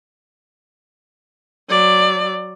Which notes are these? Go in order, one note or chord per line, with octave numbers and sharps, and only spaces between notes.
F#3 D5